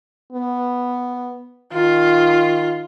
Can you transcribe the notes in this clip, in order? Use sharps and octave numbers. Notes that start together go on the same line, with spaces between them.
B3
D#3 F4